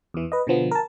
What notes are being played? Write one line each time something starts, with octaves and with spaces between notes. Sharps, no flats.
E2 E3
B4 D#5
B2 D3 F3 B3
A#4 A5